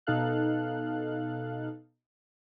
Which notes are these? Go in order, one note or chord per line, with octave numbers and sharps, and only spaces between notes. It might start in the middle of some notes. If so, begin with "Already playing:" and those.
B2 D#4 A4 F5 F#6